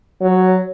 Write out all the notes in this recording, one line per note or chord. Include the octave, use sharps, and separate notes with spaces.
F#3